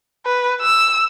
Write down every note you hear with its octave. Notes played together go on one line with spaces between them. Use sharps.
B4
E6